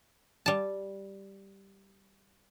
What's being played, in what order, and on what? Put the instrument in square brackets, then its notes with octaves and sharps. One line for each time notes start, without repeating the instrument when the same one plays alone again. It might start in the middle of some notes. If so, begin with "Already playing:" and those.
[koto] G3 A5